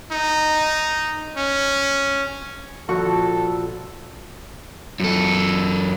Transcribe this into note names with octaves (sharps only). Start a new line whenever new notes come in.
D#4
C#4
A#1 F#4 A4
F#2 A4